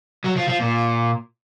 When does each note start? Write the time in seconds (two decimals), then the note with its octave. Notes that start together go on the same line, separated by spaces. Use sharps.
0.24 F#3
0.36 F3
0.48 F3
0.60 A#2